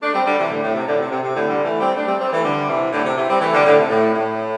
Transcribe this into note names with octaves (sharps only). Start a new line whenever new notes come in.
A3 D4
G3 C4
D3 G3
C3 E3
A2 D3
A2
C3
A2 D3
C3
C3
C3
A2 D3
D3 G3
E3 A3
G3 C4
A3 D4
G3 C4
G3 C4
E3 A3
D3 G3
C3 E3
A2 D3
C3
C3 E3
G3 C4
E3 A3
D3 G3
A2 D3
C3
A2
A2